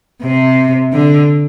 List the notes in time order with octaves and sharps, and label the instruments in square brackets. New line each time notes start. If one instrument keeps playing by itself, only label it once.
[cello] C3
D3